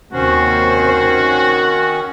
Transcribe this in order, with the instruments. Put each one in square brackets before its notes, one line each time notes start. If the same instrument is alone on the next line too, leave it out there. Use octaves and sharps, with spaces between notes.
[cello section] D#2 C3 C5 [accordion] D#3 C#4 [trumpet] F#4